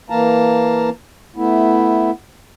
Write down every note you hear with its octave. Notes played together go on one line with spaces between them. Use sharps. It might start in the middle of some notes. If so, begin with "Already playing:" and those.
E3 A#3 F5 A5 A#5
A3 B3 E4